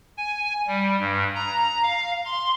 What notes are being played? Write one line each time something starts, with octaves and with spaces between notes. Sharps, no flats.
G#5
G3
G2
A#5
F5
C6